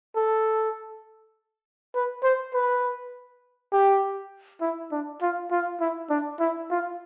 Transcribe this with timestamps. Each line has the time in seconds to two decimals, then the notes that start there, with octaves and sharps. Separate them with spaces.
0.16 A4
1.95 B4
2.23 C5
2.54 B4
3.72 G4
4.61 E4
4.92 D4
5.22 F4
5.51 F4
5.80 E4
6.10 D4
6.40 E4
6.71 F4